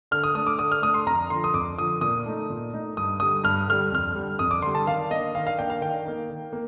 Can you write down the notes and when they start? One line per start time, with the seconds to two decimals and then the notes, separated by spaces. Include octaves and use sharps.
0.11 D3 F6
0.23 D#6
0.35 A3 D4 D#6
0.47 D6
0.59 D3 D#6
0.72 F6
0.82 A3 D4 D#6
0.94 C6
1.06 F2 A#5
1.30 D3 F3 C6
1.44 D#6
1.54 F2 D6
1.78 D3 F3 D#6
2.01 A#2 D#6
2.26 A3 D#4
2.50 A#2
2.73 A3 D#4
2.97 G2 D#6
3.20 D3 G3 D#6
3.44 G2 F6
3.67 D3 G3 F6
3.92 F2 F6
4.16 D3 G3
4.39 F2 D#6
4.51 D6
4.62 D3 G3 C6
4.75 A5
4.86 D#3 F5
5.10 A#3 D4 D#5
5.35 D#3 F5
5.47 F5
5.58 A#3 D4 G5
5.70 F5
5.81 D#3 G5
6.05 A#3 D#4
6.30 D#3
6.53 A#3